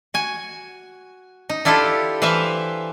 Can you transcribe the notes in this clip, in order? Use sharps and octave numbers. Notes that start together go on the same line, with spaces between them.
F#4 G#5
D#4
D4 E4 F4 G4 A4
E3 B4 C5 E5 F5